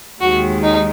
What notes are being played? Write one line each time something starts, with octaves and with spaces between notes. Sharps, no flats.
D#2 D#3 G#3 F#4
D#4